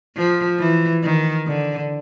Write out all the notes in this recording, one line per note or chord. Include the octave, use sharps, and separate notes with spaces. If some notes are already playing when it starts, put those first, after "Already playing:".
F3
E3
D#3
D3